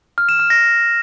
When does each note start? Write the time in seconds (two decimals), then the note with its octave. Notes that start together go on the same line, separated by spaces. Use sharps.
0.18 F6
0.29 E7
0.39 F6
0.50 A#6